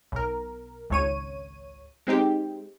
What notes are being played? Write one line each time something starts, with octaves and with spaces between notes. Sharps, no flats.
B1 A#4
G#1 C#2 C#5 D#7
G#3 C4 D#4 G4